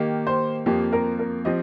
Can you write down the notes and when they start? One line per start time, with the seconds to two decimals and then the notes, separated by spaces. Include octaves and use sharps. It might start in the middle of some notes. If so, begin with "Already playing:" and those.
Already playing: D#3 A#3 G4
0.27 C5
0.66 F2 F3 A#3 G4
0.93 A#4
1.19 A#4
1.45 F3 C4 G4 D#5